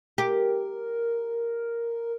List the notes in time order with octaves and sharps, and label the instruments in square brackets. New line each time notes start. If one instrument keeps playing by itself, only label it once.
[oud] G4 [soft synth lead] A#4